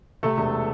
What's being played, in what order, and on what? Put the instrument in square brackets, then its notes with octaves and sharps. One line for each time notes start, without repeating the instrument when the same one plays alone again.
[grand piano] C3 A3 A4
E1